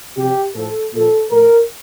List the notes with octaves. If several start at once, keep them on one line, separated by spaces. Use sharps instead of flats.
C3 F3 G4
A2 F3 A4
A#2 F3 A4
A2 F3 A#4